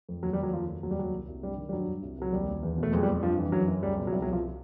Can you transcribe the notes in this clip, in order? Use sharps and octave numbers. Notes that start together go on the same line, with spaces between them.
F2
D#2 F#3
G3
D#2
F#3
F2 F3
F2
D#2 F#3
G3
D#2 F#3
C2
C2
G2 G3
D#3
G3
G2 F#3
G2
C2
C2 F#3
D#2 G3
D#2
E2
B2 A3
F2 G#3
G3
F2
G2 F3
E3
F#2 F#3
F#2
C#2 G3
B2
F#3
C2 G3
F#3
C2
F3